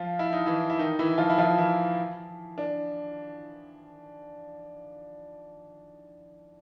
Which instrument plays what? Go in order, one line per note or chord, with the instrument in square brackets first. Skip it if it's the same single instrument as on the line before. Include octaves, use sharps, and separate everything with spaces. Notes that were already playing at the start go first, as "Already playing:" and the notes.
Already playing: [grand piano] F3 F4
E4
D#4
E3 E4
E4
D#3 D#4
E3 E4
F3 F4
E4
F3 F4
E3 E4
D4